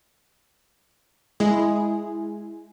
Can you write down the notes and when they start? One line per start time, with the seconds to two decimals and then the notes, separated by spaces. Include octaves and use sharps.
1.40 G#3 E4 G#4